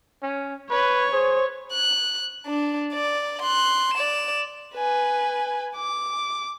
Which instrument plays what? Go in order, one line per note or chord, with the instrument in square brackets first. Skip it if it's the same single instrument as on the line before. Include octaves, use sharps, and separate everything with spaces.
[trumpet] C#4
[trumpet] B4 [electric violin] C#5
[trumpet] G#4 [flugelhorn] C5
[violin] F#6
D4
D5
C6 F#6
D5 E7
[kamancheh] B4 G#5
D6